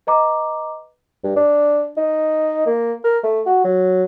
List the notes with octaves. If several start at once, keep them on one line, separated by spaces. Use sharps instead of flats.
B4 D#5 A#5 D6
G2
D4
D#4
A#3
A#4
A3
F#4
F#3